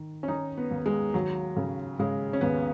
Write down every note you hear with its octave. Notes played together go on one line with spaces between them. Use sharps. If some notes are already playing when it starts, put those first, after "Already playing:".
Already playing: D#3
C#4
D#3 D#4
B3
D#2
G#3
D#2 F#3
C#3
C#3 G#3
C#4
D#2 B3